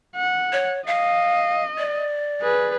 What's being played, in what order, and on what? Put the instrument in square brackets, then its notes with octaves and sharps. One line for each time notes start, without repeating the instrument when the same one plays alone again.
[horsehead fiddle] F#5
[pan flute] C#5
[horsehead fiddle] D#5 [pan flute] F5
[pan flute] D5
[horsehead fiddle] G#4 B4